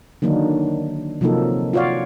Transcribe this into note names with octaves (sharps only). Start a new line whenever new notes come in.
D3 D#3 F#3 A#3 D4 D#4
C3 F3 F#3 A#3 D#4 A4
F4 F#4 C#5 D5 F5